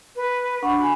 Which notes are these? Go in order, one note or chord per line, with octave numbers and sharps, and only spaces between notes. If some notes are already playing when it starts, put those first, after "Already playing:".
B4
D4 F#5 B5 C#6
F#4 G#5 B5